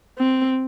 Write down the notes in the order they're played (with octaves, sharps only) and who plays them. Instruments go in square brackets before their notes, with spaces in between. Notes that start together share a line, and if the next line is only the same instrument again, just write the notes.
[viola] C4